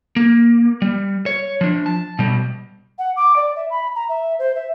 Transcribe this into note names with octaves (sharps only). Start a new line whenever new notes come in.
A#3
G3
C#5
F3 D4
A5
B2 G3
F#5
D6
D5
E5
B5
A#5
E5
C5
E5